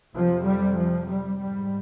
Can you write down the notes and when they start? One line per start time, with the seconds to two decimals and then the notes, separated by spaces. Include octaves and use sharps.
0.14 F2 C3 F3
0.45 G3
0.76 F3
1.07 G3
1.37 G#2 G3